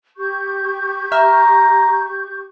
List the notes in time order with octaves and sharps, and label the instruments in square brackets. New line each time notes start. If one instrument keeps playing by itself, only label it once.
[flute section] G4 C#6 G6
[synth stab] E5 F6 [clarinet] A#5